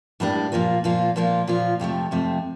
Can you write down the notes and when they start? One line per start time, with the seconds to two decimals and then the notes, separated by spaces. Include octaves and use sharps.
0.20 A2 G3 A#3 D4
0.52 A#2 F3 A#3 F4
0.84 A#2 F3 A#3 F4
1.16 A#2 F3 A#3 F4
1.47 A#2 F3 A#3 F4
1.79 F2 C3 F3 A3
2.11 F2 C3 F3 A3